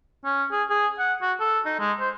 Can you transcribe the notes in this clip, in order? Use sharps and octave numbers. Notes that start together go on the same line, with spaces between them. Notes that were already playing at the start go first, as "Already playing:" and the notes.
C#4
G#4
G#4
F#5
F#4
A4
D#4
G#3
C5